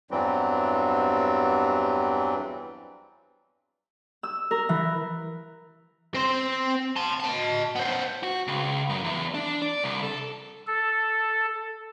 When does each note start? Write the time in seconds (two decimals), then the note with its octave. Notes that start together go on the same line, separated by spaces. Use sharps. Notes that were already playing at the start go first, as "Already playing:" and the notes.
0.11 E2 G2 E3 F#3 G3 C4
4.23 E6
4.51 A#4
4.69 E3
6.15 C4 C5
6.96 A5 C6
7.20 D#5 A5
7.75 B3 C5
8.23 F#4
8.47 C#2
8.89 F#2
9.04 E2
9.34 D4
9.62 D5
9.84 C2
10.03 A4
10.67 A4